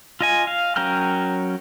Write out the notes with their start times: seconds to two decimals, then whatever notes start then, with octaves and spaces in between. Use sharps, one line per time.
0.21 F4 D#5 G#5
0.47 F5
0.76 F#3 C#4 A#4 G5 F6